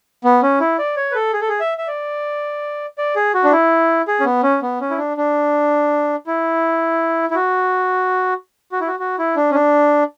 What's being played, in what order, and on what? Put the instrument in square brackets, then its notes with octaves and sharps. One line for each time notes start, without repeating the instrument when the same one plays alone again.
[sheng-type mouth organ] B3
C#4
E4
D5
C#5
B4
A4
G#4
A4
G#4
E5
E5
D5
D5
G#4
F#4
D4
E4
G#4
C#4
B3
C#4
B3
C#4
E4
D4
D4
E4
E4
F#4
F#4
E4
F#4
F#4
E4
D4
C#4
D4